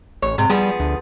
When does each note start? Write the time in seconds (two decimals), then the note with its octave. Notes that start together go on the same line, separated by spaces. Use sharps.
0.22 A1 C#5
0.38 G#2 C3
0.49 F3 G3 B3 G#4
0.80 D2